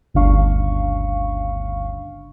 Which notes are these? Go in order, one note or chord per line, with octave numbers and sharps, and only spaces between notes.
G1 D2 C#3 D4 F5 C#6